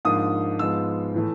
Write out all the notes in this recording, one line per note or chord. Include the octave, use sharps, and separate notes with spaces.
G#2 F3 A#3 D4 D#6
G#2 F3 G#3 B3 E6
A2 E3 A3